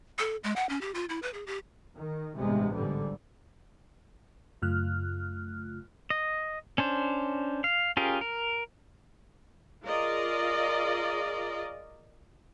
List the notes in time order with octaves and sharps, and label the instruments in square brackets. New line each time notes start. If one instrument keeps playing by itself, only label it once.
[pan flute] A4
G#3
F#5
C#4
G4
F4
E4
B4
G#4
G4
[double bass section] D#3
A1 G2 C3 G#3 B3
G#2 D3 G3
[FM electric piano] F#2 C#3 A3 F4 F6 F#6
[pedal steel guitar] D#5
C#4 D4 C5
F5
C#4 F4 G4 G#4 A#4
A#4
[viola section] F4 G#4 A#4 D5 D#5